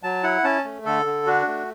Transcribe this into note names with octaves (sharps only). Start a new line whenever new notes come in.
F#3 A5
E4 F#5
C#4 A5
A3
D3 A4
D3
D4 F#4
A3